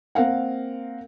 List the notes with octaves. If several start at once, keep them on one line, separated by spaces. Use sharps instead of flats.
A#3 C4 A#4 F5 F#5